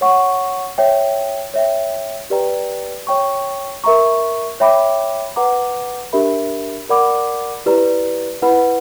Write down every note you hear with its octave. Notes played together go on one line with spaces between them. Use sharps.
C#5 F#5 C#6
C#5 E5 G5
C#5 E5 G5
G4 B4 D5 G5 A#5
C#5 G5 C#6
A#4 E5 A#5 C#6
C#5 E5 G5 B5 D6
B4 F#5 A#5 D6
D4 G4 A#4 E5 B5
A#4 D5 F#5 B5 D6
E4 G4 B4 D5 A#5
E4 B4 F#5 B5